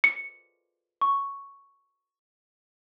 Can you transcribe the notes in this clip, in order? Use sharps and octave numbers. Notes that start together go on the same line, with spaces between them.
C#7
C#6